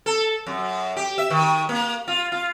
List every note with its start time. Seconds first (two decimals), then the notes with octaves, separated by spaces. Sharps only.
0.06 A4
0.47 F#2
0.97 G4
1.18 E5
1.30 D#3
1.69 A#3
2.08 F4
2.32 F4